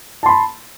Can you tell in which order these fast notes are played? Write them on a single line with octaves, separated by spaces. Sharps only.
A5 C6 B5